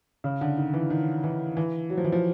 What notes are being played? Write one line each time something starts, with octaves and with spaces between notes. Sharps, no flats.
C#3
D3
D#3
E3
D#3
E3
E3
F#3
F3
E3
F3